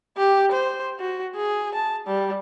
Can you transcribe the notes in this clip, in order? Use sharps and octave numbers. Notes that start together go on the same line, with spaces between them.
G4
C5
F#4
G#4
A5
G3